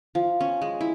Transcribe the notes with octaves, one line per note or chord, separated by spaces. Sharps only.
F3
C#4
G#3
E4